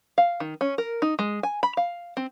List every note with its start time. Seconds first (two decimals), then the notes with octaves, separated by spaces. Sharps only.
0.18 F5
0.40 D#3
0.61 C#4
0.78 A#4
1.02 D#4
1.19 G#3
1.43 G#5
1.63 B5
1.77 F5
2.17 C4